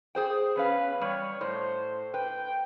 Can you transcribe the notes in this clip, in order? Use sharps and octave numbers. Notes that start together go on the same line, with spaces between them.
G#4 C5 G5
E2 C#4 B4 F5
G3 C#5
A2 C5
B4 G5